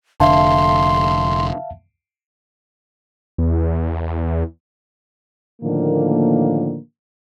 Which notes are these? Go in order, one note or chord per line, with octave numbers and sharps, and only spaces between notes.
F1 D3 E5 F5 A5 C6
E2
A2 D3 D#3 F3 A#3